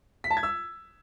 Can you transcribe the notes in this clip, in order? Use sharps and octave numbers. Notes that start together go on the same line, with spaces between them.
B6
A5
G#6
E6